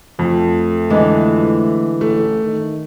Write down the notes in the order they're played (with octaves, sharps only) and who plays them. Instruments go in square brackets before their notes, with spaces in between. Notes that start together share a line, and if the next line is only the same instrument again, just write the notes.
[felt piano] F2 [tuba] A3
[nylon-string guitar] D3 E3 G#3
[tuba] A1 [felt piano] A3
[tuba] D#3